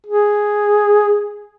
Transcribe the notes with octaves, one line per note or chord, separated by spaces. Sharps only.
G#4